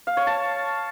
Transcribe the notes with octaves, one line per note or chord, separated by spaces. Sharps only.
F5
C#5
A5